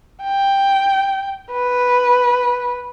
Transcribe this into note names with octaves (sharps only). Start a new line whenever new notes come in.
G5
B4